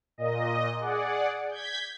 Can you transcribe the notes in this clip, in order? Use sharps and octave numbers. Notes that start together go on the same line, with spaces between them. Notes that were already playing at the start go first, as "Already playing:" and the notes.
A#2 D#5
G#4 D5 F#5
G6 G#6 B6